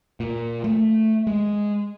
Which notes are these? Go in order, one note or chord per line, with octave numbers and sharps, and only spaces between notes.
A#2
A3
G#3